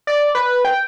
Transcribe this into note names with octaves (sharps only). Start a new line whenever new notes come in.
D5
B4
G5